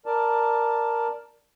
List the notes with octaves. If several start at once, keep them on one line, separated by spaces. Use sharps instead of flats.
A#4 D5 A5